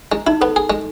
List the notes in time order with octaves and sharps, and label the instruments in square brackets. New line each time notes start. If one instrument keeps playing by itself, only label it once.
[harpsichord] G#3 [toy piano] E4
[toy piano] D#4 [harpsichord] E4
[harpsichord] B3 [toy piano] A4
[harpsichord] G#4
G#3